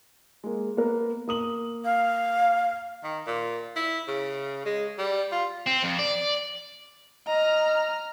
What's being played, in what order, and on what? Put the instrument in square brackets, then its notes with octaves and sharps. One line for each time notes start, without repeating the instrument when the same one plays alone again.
[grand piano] G#3 A#3
A#3 B3 A#4
A#3 D#6 F#7
[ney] F5
[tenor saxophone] D#3
A#2
E4
C#3
G#3
G3
F4
[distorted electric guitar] C4
F2
D5
[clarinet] D#5 [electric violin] A#5 F6